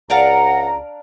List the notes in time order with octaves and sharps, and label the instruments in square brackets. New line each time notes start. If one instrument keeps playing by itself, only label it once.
[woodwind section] C#2 A#5 [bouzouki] D4 A#4 F5 [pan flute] F#5